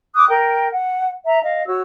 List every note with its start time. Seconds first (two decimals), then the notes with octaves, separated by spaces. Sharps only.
0.15 D6 D#6 F#6
0.29 A#4 G5
0.71 F#5
1.26 E5 A#5
1.44 D#5 F5
1.66 F#4 C#5 E6